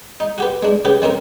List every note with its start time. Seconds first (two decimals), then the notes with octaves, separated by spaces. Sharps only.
0.20 D#4
0.38 F#4 G4 B4
0.63 G#3 D4
0.85 C#3 G4 B4
1.02 D#3 C4 C#4 A#4